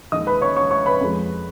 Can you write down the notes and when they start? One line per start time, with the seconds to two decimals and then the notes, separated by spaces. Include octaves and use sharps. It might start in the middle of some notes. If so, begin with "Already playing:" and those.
0.12 D#2 D#3 G#3 D#5 D#6
0.27 B4 B5
0.41 C#5 C#6
0.56 C#5 C#6
0.71 C#5 C#6
0.86 B4 B5
1.01 F2 F3 G#3